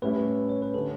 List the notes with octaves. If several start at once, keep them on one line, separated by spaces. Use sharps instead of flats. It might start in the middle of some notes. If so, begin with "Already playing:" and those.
A2 G3 C#4 E4 B4
C#5
B4
D3 G3 C#4 A4